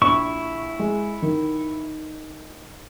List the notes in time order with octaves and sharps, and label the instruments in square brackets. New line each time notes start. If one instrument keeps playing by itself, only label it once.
[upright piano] A#1 [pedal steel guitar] E4 C#6
[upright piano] G#3
D#3